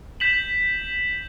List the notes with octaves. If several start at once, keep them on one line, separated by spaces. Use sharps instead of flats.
G6 B6 E7 F#7